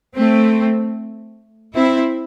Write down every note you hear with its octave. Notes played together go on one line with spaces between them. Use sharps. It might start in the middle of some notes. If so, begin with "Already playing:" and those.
A3 C4
C4 E4